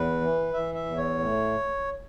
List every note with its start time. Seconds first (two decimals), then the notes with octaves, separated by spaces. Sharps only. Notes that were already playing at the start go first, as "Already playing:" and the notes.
Already playing: E2 B4
0.21 E3
0.53 E3 E5
0.75 E5
0.85 E2
0.97 C#5
1.19 A2